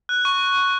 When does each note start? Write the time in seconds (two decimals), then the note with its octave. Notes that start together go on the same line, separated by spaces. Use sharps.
0.09 F#6
0.25 C#6